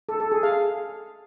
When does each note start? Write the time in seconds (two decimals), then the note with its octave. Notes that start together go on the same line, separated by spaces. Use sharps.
0.09 A4
0.20 A4
0.32 G#4
0.43 F5